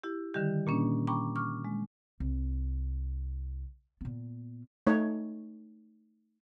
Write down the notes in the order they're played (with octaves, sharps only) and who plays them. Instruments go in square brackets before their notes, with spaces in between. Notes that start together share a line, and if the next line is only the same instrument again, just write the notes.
[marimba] E4 G4
D3 D#3 G3 G4
A#2 A#3 C#4 D4
G5 A#5 B5 C#6 D6
C#6 D6 F6
G#3
[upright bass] C2
A#2 B3
[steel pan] A3 D#4 C#5